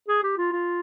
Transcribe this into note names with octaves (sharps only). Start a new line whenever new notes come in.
G#4
G4
F4
F4